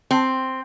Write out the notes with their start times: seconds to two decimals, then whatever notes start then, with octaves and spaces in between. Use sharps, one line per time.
0.11 C4